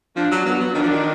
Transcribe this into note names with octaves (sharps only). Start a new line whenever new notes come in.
F3 D4
F#3
F#3 B3
F#3
D#3 D4
F3
D#3